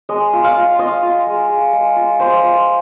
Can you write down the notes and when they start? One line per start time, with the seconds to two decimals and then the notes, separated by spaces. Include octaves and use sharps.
0.09 G#3 D#5
0.33 F4
0.44 F5
0.56 F4
0.79 F4 D#5
1.03 F4
1.26 G#3
1.49 G#3
1.73 G#3
1.96 F4
2.20 F4 C5
2.43 F4